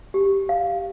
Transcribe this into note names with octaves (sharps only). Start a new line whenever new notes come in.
G4
F5